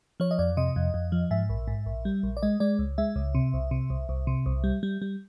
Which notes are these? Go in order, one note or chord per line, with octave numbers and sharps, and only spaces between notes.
F3 C#5
D#5
F2 D5
C3 D#5
F2
F2
F3
G#2 E5
A#1
G#2
A#1
G3
A#1
D5
G#3 D#5
G#3 D5
C#2
G#3 E5
C#2
C3
C2
C3
C2
C2
C3
C2
G3
G3
G3